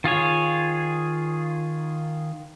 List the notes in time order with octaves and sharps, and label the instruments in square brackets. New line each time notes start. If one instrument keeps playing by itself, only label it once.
[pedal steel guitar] D#3 F4 G#4 C#5